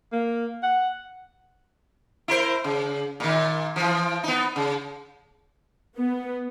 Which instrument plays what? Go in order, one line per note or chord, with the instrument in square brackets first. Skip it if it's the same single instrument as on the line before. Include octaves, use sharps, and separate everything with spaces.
[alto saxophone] A#3
F#5
[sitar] E4 A#4 C5
C#3
A#2 D#3
E3 F3
B3 D#4
C#3
[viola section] B3